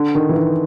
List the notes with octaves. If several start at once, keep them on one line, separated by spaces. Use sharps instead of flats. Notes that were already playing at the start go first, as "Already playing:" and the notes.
Already playing: D3
D#3
E3
D#3